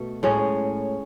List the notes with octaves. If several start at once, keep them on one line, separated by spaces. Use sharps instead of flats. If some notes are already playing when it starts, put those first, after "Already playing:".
Already playing: B2 A3
A2 G#3 C#4 G#4